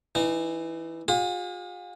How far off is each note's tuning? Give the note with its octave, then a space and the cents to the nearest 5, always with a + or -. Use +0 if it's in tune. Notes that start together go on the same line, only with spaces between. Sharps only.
E3 +0 D#4 -35
F4 +40 G#4 -45